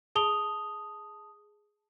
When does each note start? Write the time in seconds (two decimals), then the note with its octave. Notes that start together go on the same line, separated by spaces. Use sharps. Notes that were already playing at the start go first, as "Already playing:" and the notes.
0.15 G#4 A5 D#6 F7 G7